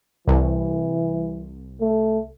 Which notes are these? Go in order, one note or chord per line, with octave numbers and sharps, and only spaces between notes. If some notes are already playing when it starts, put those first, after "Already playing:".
C2 E3
A3